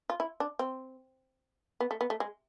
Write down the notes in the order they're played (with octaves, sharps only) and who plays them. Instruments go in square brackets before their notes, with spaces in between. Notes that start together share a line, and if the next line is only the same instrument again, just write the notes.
[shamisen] F4
E4
D4
C4
B3
A3
B3
A3
G#3